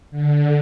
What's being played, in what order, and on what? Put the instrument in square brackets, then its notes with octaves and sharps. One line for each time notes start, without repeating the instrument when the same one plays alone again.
[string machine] D3